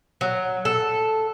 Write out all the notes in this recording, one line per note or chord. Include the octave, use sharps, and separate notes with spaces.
F#3
A4